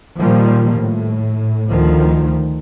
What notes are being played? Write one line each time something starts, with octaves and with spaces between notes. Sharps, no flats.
A#2 D#3 F3 G3 A#3
A2
D2 D#3 F3